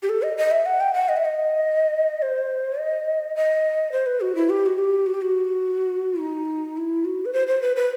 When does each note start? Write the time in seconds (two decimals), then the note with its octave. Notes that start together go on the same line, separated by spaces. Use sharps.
0.03 G4
0.09 A4
0.22 D#5
0.37 D#5
0.51 E5
0.66 F#5
0.80 G5
0.94 F#5
1.09 D#5
1.17 E5
1.25 D#5
2.22 C5
2.79 D#5
3.36 D#5
3.92 C5
4.06 B4
4.21 F#4
4.36 E4
4.50 G4
4.66 F#4
4.78 G4
5.06 F#4
5.14 G4
5.22 F#4
6.20 D#4
6.77 E4
7.05 F#4
7.25 B4
7.33 C5
7.48 C5
7.62 B4
7.76 B4